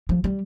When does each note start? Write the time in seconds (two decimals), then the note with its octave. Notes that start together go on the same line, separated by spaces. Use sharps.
0.09 F3
0.24 G3